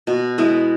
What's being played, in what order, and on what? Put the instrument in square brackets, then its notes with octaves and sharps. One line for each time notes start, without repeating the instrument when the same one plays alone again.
[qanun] B2
G#3 B3 E4